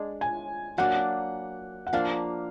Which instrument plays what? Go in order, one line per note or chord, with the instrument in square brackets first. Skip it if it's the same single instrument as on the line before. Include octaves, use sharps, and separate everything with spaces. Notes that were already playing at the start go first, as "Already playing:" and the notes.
Already playing: [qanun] G#3 D4 G#4
[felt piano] G#5
[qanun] F#3 A#3 D4 [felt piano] F#5
[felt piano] F#5
[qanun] F3 A#3 D4 [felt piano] F5